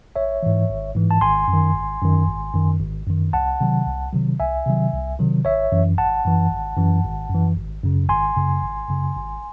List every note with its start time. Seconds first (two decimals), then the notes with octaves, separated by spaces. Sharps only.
0.16 G#1 C#5 E5
0.43 G#2 E3
0.70 G#1
0.96 G#2 E3
1.11 A5
1.21 G#1 G#5 C6
1.48 F#2
1.53 D#3
1.74 G#1
2.02 F#2 D#3
2.28 G#1
2.54 F#2 D#3
2.80 G#1
3.07 F#2 D#3
3.33 C2 F#5 A5
3.61 C3 D#3 F#3
3.87 C2
4.13 C3 D#3 F#3
4.39 C2 E5 G#5
4.66 C3 D#3 F#3
4.93 C2
5.19 C3 D#3 F#3
5.45 G#1 C#5 E5
5.72 F#2 E3
5.97 G#1 F#5 A5
6.25 F#2 E3
6.51 G#1
6.77 F#2 E3
7.04 G#1
7.30 F#2 E3
7.57 G#1
7.84 F#2 C#3
8.09 G#1 G#5 C6
8.36 F#2 C#3
8.62 G#1
8.88 F#2 C#3
9.16 G#1